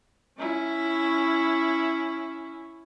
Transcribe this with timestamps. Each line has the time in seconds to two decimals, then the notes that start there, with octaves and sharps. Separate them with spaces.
0.39 C#4 E4